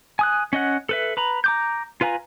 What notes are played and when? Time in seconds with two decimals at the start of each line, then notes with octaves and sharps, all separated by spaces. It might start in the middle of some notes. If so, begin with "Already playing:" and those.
0.19 G#5 D#6 F#6
0.53 C#4 D#5 F#5
0.89 A4 B4 E5
1.17 B4 A#5 B5
1.44 A#5 D6 G6
2.01 F4 B4 F5 G#5 A#5